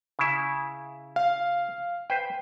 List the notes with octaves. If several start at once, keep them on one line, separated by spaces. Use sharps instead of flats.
C#3 E4
F5
B4 C5 G5